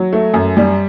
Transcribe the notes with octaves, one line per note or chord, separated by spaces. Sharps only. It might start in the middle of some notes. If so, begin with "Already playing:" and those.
Already playing: F#3
A3
F#2
G3